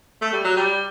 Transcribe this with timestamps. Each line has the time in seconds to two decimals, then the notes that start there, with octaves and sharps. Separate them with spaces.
0.22 A3
0.33 G3
0.44 F#3
0.56 G3